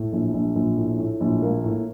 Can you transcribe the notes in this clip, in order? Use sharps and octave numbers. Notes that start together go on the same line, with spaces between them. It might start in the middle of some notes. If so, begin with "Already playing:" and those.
Already playing: A2
A#1
A#1
A#1
A2
A2
A#1
A#3
A2